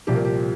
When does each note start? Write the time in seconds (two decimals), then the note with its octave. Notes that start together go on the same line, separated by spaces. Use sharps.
0.07 C2 A#2 F3 G4
0.16 A#4
0.25 G4